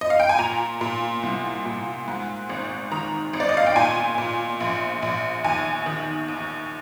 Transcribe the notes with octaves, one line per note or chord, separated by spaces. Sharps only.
D#5
F5
G5
G#5
A#2 A#5
A#2
C2
A#2
G#2
G#1
D#3 A#5
G#1
D5
D#5
F5
G5
A#2 G#5
A#2
A#1
A#1
D#2 G#5
D#3
D#2